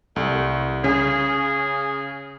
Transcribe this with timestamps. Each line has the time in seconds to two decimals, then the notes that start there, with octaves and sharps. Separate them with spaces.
0.16 C2 A3
0.84 C#3 C#4 G#4